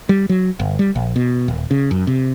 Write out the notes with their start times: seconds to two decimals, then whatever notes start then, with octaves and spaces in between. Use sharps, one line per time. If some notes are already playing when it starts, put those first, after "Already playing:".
0.09 G3
0.29 F#3
0.60 G1
0.79 G3
0.95 A#1
1.16 B2
1.48 D#1
1.71 C#3
1.91 F#2
2.07 C3